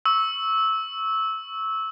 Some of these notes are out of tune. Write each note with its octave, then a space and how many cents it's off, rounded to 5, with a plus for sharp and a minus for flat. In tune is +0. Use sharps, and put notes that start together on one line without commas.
C#6 +0 E6 -15